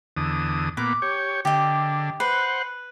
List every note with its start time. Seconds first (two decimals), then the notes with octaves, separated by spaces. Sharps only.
0.17 E2 D3 D#6
0.77 A#2 B3 D6
1.02 G4 C#5
1.45 D3 G4 D#5
2.20 B4 C5 F#5